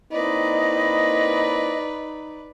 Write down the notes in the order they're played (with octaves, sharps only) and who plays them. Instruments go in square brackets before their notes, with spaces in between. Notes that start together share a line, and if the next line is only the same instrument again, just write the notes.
[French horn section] A#3 C4 E4 [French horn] D#4 [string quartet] B4 D5 [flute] D#5